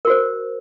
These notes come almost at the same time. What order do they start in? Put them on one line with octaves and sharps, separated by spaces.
A#4 F#4 C5